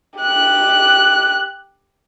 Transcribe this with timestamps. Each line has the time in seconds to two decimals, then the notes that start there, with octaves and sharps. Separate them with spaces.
0.19 G4 F#6